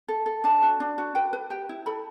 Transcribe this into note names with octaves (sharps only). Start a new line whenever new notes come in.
A4
A4
D4 A5
F#4
D4
F#4
B4 G5
B4
G4 G5
E4
A4 B5